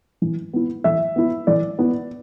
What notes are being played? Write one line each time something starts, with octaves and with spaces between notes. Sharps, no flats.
E3
B3 E4
E3 E5
B3 E4
E3 D5
B3 E4